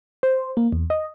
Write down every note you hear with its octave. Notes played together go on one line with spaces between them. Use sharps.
C5
A#3
E2
D#5